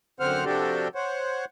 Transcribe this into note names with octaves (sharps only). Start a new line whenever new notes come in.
F#2 D3 C4 C5 F#5 F6
C3 F3 D4 F#4 G4 A4
C5 C#5 F#5